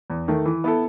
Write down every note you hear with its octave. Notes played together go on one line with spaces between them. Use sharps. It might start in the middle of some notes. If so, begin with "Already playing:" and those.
E2
D#3 A3
E3
B3 E4 A4